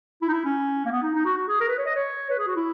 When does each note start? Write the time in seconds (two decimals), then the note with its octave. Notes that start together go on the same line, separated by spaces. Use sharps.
0.22 E4
0.28 D#4
0.33 E4
0.45 C#4
0.85 A#3
0.91 B3
1.02 D#4
1.14 D#4
1.25 F#4
1.37 F#4
1.48 G#4
1.60 A#4
1.68 B4
1.78 C#5
1.86 D#5
1.95 C#5
2.30 B4
2.38 G#4
2.47 F#4
2.56 E4